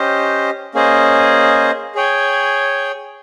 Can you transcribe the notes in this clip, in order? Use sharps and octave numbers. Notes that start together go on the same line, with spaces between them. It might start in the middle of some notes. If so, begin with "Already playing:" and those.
Already playing: C#4 G4 C5 D#5
A#3 C#4 G#4 C5 D#5
G#4 C#5 G5